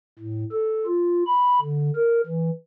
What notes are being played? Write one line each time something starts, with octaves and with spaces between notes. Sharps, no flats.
A2
A4
F4
B5
D3
A#4
E3